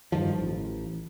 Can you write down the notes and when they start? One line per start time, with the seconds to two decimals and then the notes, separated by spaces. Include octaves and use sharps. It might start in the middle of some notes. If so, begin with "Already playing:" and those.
0.12 G2 D#3 F3
0.38 A1